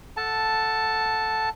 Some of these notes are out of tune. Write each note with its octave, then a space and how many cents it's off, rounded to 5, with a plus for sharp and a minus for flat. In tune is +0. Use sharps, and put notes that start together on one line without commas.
A4 +0 F#5 -5 A5 +0